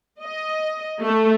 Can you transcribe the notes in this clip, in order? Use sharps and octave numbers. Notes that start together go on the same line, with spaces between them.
D#5
A3